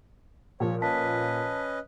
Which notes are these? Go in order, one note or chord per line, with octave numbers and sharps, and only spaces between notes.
A#2 F3 C#5
C#4 B4 D#5 A5 B6